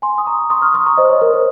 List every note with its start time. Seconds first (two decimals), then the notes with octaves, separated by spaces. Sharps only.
0.02 G#5 C6
0.18 D#6
0.26 A#5 C#6
0.50 C6 D#6
0.62 C#6 F6
0.74 C6 D#6
0.86 A#5 C#6
0.97 C5 D#5
1.10 C#5
1.21 A#4
1.34 C5